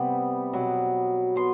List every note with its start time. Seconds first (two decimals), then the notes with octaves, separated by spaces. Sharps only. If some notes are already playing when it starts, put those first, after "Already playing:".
Already playing: C3 G3 B3 B5
0.53 B2 F#3 B3
1.36 B3 C6